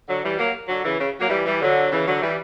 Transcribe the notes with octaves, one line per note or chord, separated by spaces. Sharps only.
D3 F#3
E3 G3
F#3 A#3
D3 F#3
C#3 E3
C#3
F#3 A#3
E3 G3
E3 G3
D3 F#3
C#3 E3
D3 F#3
E3 G3